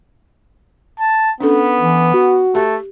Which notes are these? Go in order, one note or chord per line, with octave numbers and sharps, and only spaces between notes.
A5
B3 C#4 D4 A4
E3
F#4
A3 G4